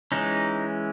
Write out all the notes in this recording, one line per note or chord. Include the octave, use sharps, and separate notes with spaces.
E3 G#3 C#4 D#4